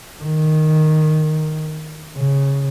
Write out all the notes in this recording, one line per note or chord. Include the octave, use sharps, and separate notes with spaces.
D#3
C#3